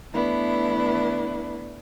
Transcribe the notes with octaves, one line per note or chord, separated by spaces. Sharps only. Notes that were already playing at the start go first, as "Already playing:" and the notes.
E3 A3 B3 D4 E4